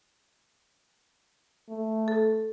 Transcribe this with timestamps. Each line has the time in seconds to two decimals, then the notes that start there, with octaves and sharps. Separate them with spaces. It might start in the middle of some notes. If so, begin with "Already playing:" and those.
1.69 A3
2.08 A4